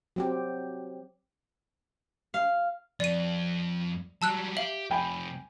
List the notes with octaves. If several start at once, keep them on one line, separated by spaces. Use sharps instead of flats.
F#3 C4 G4
F5
F2 D5 D#7
F#3 G3 A5 E6 F#6
G4 E5 F5 F#7
F2 C3 G5 G#5 B5